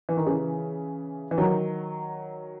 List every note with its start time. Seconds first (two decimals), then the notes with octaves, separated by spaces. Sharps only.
0.09 E3
0.17 D#3
0.26 C#3 E3
1.31 E3
1.38 D#3 F#3